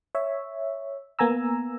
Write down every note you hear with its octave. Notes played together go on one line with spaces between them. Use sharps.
C#5 E5
A#3 B3 G#5 A#5 E6